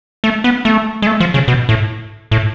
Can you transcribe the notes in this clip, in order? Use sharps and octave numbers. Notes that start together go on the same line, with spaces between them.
A3
B3
A3
G#3
A3
F3
C#3
B2
A2
A2